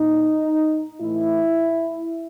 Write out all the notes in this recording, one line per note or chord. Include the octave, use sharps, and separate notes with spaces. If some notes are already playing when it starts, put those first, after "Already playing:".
Already playing: A#2 D#4
A2 E3 E4